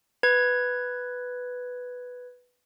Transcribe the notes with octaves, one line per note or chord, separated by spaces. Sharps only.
B4 G#6